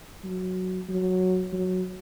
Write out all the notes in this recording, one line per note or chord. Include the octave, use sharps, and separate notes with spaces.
F#3
F#3
F#3